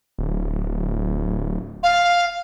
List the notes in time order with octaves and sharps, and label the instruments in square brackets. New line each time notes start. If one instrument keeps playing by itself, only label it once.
[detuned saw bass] D1
[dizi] F5